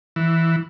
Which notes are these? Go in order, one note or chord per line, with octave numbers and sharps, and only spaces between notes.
E3